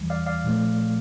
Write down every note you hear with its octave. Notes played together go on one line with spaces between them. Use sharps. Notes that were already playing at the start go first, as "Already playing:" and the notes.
Already playing: E2 E3 G3
D5 F5
D5 F5
A#2 F3 A3